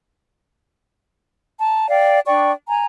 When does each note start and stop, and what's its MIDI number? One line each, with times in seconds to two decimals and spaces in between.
1.59 1.87 81
1.59 1.87 82
1.89 2.20 74
1.89 2.20 77
1.89 2.20 79
2.26 2.52 62
2.26 2.52 74
2.26 2.52 79
2.26 2.52 85
2.68 2.86 80
2.68 2.86 82